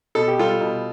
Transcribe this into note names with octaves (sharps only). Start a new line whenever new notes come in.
B2 A4
G4
G3 F4 A4
B2